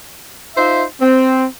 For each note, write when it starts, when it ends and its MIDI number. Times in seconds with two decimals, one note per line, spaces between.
0.56 0.83 63
0.56 0.83 65
0.56 0.83 72
0.56 0.83 76
1.01 1.45 60